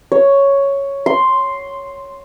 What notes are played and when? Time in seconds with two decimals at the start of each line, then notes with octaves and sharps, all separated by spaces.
0.12 C#5
1.06 C6